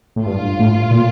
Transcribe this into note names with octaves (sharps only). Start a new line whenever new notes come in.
A2
G2 F4
A2
A#2